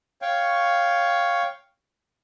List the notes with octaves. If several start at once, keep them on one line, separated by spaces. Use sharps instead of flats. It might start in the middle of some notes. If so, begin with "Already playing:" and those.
C#5 F5 G5 C#6